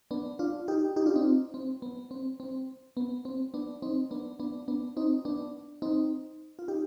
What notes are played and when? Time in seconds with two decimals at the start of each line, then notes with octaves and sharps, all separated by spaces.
0.11 B3 D4
0.39 D4 F4
0.68 D#4 G4
0.96 D#4 G4
1.06 D4 F4
1.16 C4 D#4
1.54 C4
1.82 B3
2.11 C4
2.40 C4
2.97 B3
3.25 C4
3.54 B3 D4
3.82 C4 D#4
4.11 B3 D4
4.40 B3 D4
4.68 B3 D4
4.97 C4 D#4
5.25 B3 D4
5.82 C4 D#4
6.59 F4
6.68 D#4 G4